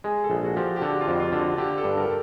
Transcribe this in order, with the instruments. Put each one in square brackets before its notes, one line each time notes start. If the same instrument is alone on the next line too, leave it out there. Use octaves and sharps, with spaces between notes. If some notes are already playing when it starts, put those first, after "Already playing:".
[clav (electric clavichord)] G#3 [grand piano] G#4
[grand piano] A4
[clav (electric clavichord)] A#1 [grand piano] G#4
[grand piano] F#4
[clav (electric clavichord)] F3 [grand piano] G4
[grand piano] G4
[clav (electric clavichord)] D3 [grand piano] F#4
[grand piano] F4
[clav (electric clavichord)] F2
[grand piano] F4
[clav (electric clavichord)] D3
[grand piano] F#4
[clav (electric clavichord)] D3 [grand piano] G4
[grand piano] A4
[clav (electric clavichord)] G2
[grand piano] A#4